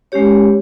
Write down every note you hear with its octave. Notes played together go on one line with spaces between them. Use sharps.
G#3 C#4 G4 C#5